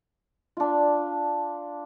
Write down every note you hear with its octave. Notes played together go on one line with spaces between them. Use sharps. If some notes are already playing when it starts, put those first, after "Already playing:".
D4 F4